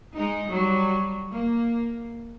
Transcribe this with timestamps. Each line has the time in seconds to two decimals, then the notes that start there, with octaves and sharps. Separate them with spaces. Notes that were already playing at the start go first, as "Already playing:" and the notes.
0.15 G#3 D#4
0.50 F#3 G3
1.30 A#3